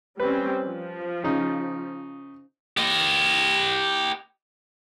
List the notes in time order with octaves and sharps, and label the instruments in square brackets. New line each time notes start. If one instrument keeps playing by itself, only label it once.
[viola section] G3 C4 C#4 [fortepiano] B4
[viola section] F3
[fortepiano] C#3 D#4
[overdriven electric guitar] G4 D#5